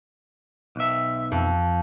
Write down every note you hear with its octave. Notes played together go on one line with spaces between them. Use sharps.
B1 E5
F2